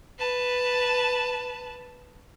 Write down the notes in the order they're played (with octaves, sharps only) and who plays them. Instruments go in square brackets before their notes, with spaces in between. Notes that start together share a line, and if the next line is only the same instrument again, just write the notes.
[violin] B4 A5